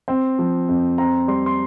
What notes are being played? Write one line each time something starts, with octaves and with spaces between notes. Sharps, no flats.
C4
F3
F2
C4 A#5
G3 C6
C6